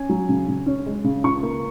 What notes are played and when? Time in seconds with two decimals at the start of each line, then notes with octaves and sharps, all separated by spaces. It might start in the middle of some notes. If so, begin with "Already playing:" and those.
Already playing: C#4 G#5
0.09 F#3
0.29 C#3
0.48 C#3
0.66 C#4
0.86 G#3
1.04 C#3
1.24 C#2 C#6
1.43 A#3